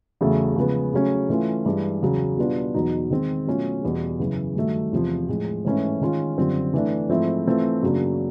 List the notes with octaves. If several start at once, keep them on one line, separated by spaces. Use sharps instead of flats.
E2 C#3 F#3 A3
C#3 F3 G#3 B3
C#3 F#3 A3 C#4
E3 A3 C#4 F4
G2 E3 G#3
E2 C#3 F#3
B2 G3 B3 D4 F4
E2 B2 F#3 B3 D#4
D#3 G#3 C4
B2 F#3 A3 C#4 F4
E2 B2 G3
F#2 C#3 E3
G2 D#3 F#3 A3
E2 C3 F3
A2 F3 G#3
G#2 E3 A3 C#4 E4
D#3 G#3 C#4 F4
F#2 D3 G3 C4 F4
E3 A3 D4
G#2 F3 A3 C4 E4
E3 A3 C4 F4
F#2 C#3 F#3 A#3 D4